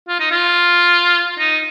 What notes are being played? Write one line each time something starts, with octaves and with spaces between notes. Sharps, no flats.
F4
D#4
F4
D#4